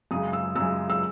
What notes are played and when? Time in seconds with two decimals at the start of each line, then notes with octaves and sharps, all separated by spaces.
0.11 F#2 C#3 G#3 D#6
0.33 E6
0.56 F#2 C#3 G#3 E6
0.90 E6